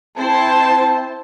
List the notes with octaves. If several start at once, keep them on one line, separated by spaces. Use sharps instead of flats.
C4 E4 C5 A5